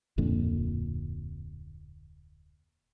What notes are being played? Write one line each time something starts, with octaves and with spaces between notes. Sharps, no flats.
D1 F2 A#2 D3